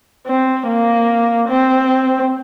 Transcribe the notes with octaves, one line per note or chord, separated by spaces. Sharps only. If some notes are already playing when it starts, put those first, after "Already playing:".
C4
A#3
C4